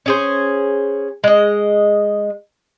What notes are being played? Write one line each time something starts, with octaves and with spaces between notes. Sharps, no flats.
C#4 G#4 C5
G#3 D#5